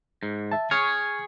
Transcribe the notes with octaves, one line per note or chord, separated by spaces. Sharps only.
G#2
E5 A5
G#4 C#5 C#6 F6